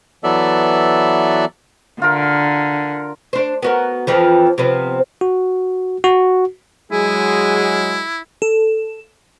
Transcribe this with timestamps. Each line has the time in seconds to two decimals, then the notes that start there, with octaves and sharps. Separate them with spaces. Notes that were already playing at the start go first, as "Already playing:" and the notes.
0.24 E3 F#3 B3 A4 D5 E5
2.02 D3 F4 A#4
3.33 D4 C5
3.62 B3 F#4 A#4
4.07 F2 E3 F3
4.58 C3 F3 B3
5.21 F#4
6.04 F#4
6.92 F#3 G#3 E4 G#4
8.42 A4